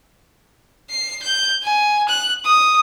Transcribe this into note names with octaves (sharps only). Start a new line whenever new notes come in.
C7
G6
G#5
F#6
D#6